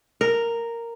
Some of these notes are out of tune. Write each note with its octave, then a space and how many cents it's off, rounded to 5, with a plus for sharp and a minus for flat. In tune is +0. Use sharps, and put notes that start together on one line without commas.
A#4 -5